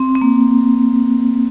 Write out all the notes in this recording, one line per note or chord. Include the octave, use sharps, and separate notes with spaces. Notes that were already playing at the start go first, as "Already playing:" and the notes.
Already playing: C4
C4
A#3